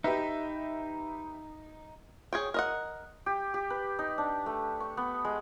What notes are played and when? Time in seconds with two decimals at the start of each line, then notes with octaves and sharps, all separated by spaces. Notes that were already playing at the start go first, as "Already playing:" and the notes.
0.04 D#4 G4 B4 E5
2.33 G#4 C#5 G5
2.54 A#4 D#5 F#5
3.26 G4
3.54 G4
3.70 B4
3.99 D#4
4.18 D4
4.46 A3
4.80 C#6
4.97 B3
5.25 G#3